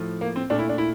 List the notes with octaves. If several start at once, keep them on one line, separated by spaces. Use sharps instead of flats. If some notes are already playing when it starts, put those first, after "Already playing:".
Already playing: A2 F3 A3
A#3
C4
A#2 A3 D4
E4
D4
E4